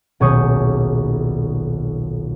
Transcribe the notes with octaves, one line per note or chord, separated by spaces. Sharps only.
D#1 B1 G#4 C#6 D#6 G6